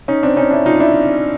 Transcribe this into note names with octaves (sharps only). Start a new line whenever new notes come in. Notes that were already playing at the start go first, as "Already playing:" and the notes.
C#4 D#4
C4 D4
C#4 D#4
D4 E4
D#4 F4
D4 E4